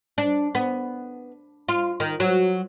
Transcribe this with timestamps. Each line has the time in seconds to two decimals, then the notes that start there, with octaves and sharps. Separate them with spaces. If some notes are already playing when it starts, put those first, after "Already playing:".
0.18 D4
0.55 B3
1.69 F4
2.00 D#3
2.20 F#3